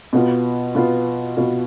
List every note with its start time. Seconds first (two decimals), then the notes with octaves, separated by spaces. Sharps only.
0.13 B2 B3 F4
0.75 B2 B3 F4
1.37 B2 B3 F4